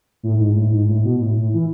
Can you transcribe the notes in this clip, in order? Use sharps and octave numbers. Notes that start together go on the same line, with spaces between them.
A2
G#2
A2
G#2
A2
B2
A2
A2
E3